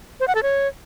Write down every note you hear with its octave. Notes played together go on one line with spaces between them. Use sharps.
C5
F#5
A4
C#5